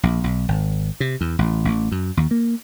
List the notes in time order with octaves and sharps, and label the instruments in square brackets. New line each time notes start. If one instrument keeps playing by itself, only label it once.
[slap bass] A#1
B1
G#1
C3
E2
A1
A1
F#2
D#2
A#3